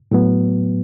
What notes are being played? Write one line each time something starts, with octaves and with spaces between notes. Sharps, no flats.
A2 F#3 B3